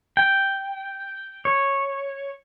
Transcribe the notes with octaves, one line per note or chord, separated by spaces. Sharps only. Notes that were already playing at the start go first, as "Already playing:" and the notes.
G5
C#5